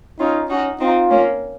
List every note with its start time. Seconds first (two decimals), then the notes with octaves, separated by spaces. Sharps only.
0.19 C#4 D#4 F4
0.50 C#4 D#4 F#4
0.80 C4 D#4 F4
1.11 A#3 C#4